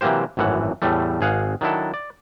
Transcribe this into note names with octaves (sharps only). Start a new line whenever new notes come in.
C3 E3 F#3 A#3 G4 C5
G#1 F#2 A2 E3 F#5
E2 A2 G3 A3
G#1 G#4 F5 F#5
D#3 F#3 D4 E4 A4
D5